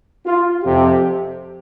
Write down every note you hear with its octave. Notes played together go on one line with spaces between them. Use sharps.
F4
F2 C3 F3 G4